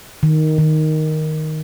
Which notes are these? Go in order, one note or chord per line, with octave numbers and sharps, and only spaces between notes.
D#3
D#3